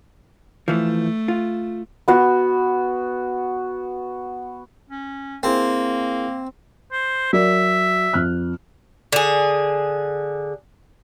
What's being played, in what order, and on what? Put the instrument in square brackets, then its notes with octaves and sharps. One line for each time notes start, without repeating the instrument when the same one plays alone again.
[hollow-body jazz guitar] E3 F3 [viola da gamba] A3
[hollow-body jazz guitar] F4
[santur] B3 F#4
[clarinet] C#4
[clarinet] A#3 [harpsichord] C4 [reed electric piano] E4 G#4 A#4
[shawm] C5
[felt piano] F#3 A#4 D5 [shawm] E5
[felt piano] F2 F6 F#6
[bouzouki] D3 G#4